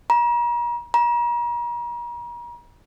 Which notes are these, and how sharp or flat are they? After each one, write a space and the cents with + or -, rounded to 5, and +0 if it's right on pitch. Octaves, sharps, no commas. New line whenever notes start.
A#5 +40
A#5 +40